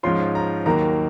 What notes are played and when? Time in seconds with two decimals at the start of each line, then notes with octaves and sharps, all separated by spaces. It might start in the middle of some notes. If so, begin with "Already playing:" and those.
0.03 G#2 F3 G#3 C#4 F4 C6
0.35 A#5
0.66 D#2 D#3 F#3 A#3 A#5